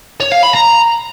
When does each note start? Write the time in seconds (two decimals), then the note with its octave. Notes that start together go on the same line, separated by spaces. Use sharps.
0.20 C#5
0.32 F5
0.43 B5
0.54 A#5